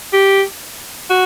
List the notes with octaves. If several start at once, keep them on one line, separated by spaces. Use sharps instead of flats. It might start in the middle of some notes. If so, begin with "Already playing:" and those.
G4
F#4